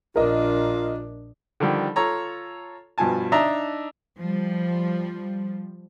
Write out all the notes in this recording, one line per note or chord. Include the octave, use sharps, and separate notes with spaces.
A#1 D4 F4 A#4 D#5
D3 D#3 F3 G3
F4 A4 C#5 A#5
G2 B2 F3 G#5 A5
D4 D#4 D#5 E5 A5 A#5
F3 G3